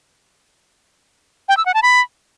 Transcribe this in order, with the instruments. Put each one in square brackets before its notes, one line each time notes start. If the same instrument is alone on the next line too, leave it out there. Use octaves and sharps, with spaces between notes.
[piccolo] G5
E6
F#5
A5
B5